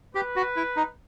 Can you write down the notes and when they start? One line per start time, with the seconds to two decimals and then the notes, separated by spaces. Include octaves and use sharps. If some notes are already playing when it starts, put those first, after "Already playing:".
0.15 G4 B4
0.36 F#4
0.56 E4
0.76 D#4